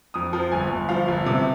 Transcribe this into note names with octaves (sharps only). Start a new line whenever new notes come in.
F2 D#6
F3
G1 G#5
G1
F3 F5
G1
C3